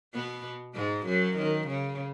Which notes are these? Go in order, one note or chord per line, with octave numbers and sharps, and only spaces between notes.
B2 B3
G#2 G#3
F#2 F#3
D#3
C#3